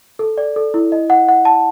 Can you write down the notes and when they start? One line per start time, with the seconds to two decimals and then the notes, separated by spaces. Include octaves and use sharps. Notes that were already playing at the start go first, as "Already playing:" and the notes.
0.19 A4
0.38 D5
0.56 A4
0.74 E4
0.92 D#5
1.10 F#5
1.28 F#5
1.45 A5